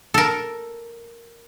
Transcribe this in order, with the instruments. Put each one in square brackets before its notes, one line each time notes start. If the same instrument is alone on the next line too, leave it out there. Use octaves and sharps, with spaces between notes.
[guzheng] A4 A#4